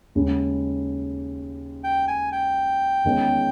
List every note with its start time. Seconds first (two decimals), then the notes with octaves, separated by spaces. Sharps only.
0.15 D#2 C#3 G#3
1.84 G5
2.08 G#5
2.32 G5
3.04 E2 D#3 G#3 C#4